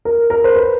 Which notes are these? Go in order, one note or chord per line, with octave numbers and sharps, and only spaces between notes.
A#4
A#4
C5
B4